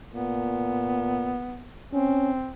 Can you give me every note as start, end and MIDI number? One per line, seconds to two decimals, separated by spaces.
0.14 1.42 46
0.14 1.73 59
1.93 2.53 60
1.93 2.31 61